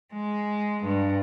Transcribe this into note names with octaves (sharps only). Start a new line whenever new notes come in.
G#3
G2